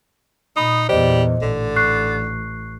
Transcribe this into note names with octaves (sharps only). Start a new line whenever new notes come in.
A#2 D#4 B5 D#6
E2 A#2 G3 C5 D#5
A1 D3
C#6 F#6 C7